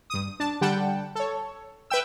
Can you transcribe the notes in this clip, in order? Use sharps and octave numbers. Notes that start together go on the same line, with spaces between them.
G2 D#6
D4 A5
D3 G3 F#5 G5 A5
A4 C#5
B4 E5 G5 E6